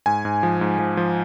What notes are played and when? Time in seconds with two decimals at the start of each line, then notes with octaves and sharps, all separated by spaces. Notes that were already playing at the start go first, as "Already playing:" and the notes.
0.06 G#2 G#5
0.25 G#2
0.43 F3
0.61 G#2
0.79 F3
0.97 F3